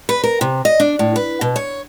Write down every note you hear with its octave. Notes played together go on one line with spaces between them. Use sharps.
B4
A#4
C3
D#5
D4
A2
B4
B2
C#5